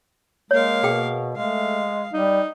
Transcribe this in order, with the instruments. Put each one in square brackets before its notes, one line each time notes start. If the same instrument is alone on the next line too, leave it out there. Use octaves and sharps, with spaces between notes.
[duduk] G#3 [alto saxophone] A#3 [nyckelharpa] A#4 F5 [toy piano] C#5
[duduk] B2 [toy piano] G#4 G5
[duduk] G#3 [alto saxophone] A3 [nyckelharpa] F5
[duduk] G3 [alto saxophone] D#4